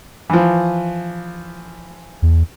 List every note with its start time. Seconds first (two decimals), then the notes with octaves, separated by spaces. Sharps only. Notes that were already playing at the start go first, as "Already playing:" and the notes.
0.30 E3 F3
2.22 E2